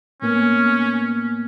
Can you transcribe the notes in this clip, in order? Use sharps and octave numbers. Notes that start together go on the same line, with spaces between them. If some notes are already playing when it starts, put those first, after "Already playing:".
A2 A#3 B3 C#4